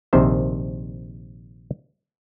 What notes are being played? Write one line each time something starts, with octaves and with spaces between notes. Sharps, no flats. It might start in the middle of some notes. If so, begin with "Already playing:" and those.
A#1 C3 D#3 C5 E5